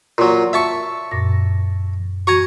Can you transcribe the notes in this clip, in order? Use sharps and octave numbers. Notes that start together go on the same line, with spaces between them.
A#2 F#3
E5 A5 C#6
F#2 A#2 A#6
F#4 G#5 A#5 C#6